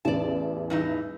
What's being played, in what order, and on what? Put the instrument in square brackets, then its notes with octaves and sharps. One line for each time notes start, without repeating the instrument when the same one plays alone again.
[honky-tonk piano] A1 E2 [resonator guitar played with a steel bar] D5 A5
[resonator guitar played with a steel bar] G2 E3 D#4